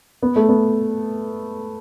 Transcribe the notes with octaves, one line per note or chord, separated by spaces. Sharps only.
B3
A3
B3